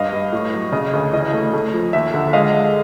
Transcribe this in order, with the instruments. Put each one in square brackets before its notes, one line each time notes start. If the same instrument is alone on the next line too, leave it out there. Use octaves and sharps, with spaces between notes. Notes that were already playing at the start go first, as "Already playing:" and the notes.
Already playing: [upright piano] G2 D#5 F5
G2
A2
F#3
C#3 D#5
D2
E3 D#5
A3
A3
F3
D#2 E5
D3
G#3 D#5 F5
G#3